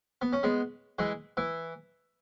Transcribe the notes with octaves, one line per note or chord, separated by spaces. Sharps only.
B3
C#4
G#3 B3
E3 G#3
E3